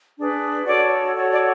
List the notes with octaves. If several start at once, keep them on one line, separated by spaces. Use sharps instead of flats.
D4 G#4 B4
F#4 A4 C#5 D5
F#4 A4 C#5
D5